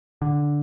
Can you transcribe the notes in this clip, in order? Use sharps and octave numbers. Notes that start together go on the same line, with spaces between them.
D3